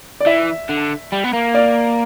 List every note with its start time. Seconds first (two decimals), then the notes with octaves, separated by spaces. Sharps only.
0.20 D5
0.26 E3 E5
0.69 D3
1.12 G3
1.24 B3
1.33 A#3
1.54 D5